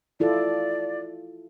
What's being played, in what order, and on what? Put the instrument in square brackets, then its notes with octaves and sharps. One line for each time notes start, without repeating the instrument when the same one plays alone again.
[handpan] E4 F4 A4 [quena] D5